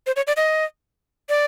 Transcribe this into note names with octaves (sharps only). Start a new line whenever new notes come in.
C5
C#5
D5
D#5
D5